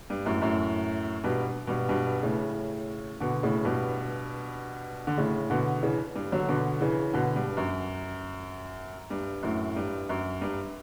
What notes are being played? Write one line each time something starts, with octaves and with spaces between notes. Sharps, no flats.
G2
F#2 A2
F#2 A2
G2 B2
G2 B2
G2 B2
A2 C#3
B2 D3
A2 C#3
G2 B2
D3
A2 C#3
B2 D3
C#3 E3
G2
D3 F#3
B2 D3
C#3 E3
B2 D3
G2
F#2
G2
F#2 A2
G2
F#2
G2